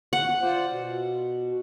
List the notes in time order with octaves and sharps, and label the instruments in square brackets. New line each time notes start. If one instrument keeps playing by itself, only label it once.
[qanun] F#5
[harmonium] F4 C5 D5
B2